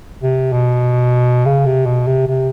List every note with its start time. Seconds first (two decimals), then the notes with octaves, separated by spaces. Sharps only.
0.23 C3
0.52 B2
1.46 C#3
1.66 C3
1.86 B2
2.07 C3
2.27 C3